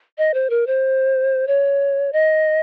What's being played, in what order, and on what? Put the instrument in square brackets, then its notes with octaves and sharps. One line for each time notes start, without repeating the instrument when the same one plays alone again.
[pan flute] D#5
C5
A#4
C5
C#5
D#5